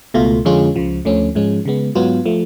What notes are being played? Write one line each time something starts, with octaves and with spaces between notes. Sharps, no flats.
C#2 B2 A3 F4
F2 D3 G#3 C#4 F4
C#2 C#3 F3
D2 D3 F3 A3 C#4
G#2 F3 G#3 C#4
C#3 G#3 B3
G#2 F#3 B3 F4
F3 A3